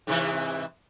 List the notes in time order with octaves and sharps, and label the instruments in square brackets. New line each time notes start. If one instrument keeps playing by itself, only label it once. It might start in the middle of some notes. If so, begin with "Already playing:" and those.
[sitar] G#2 C3 E3